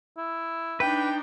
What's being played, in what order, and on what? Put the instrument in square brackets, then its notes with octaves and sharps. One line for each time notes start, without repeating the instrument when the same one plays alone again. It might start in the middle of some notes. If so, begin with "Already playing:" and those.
[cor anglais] E4
[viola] D4 D#4 [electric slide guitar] B4 [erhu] G5